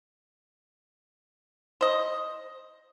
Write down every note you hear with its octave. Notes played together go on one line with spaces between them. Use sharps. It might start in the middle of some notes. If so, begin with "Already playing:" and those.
C5 D#5